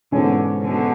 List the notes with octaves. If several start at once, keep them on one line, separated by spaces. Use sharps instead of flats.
G#2 B2 D3 E3 G#3 C#4
B2 D3